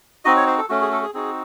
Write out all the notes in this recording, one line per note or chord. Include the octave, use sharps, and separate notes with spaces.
C4 D#4 F#4 D#5
C#5
C5
A4
A3 C#4 F#4
G#4
A4
G#4
C4 D#4 F#4 G#4